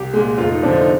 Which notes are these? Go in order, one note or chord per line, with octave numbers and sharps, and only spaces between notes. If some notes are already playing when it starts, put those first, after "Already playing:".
Already playing: C2 G4
A#2 G#3
F1 F4
D#4
F2 D3 F3 D4
D#4